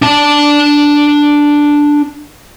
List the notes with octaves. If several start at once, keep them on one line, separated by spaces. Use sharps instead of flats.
D4 A5